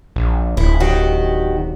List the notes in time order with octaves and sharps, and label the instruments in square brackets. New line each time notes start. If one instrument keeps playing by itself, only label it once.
[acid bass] A#1
[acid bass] D1 [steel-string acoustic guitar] E4
[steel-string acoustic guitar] D#3 F#4 G4